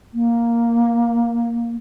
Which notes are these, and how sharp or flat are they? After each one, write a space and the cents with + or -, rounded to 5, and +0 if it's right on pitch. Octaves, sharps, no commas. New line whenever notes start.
A#3 +5